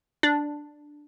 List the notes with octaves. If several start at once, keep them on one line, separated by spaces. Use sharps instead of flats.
D4